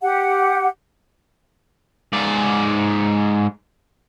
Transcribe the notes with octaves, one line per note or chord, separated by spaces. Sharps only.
G4 F#5
G#2 D5